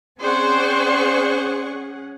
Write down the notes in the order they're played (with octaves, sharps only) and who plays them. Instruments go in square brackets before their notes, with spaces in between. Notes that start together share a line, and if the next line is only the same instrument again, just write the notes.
[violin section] C4 D5 C#6 [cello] C#4 [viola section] G#4 F#5 [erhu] C5